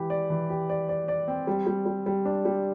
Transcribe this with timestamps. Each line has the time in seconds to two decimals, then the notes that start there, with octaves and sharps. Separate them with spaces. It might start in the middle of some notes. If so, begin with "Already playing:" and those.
Already playing: E3 G4
0.10 D5
0.30 E3
0.50 G4
0.69 D5
0.89 D5
1.08 D5
1.28 C4
1.47 G3
1.66 G3
1.86 G3
2.06 G3
2.25 D4
2.45 G3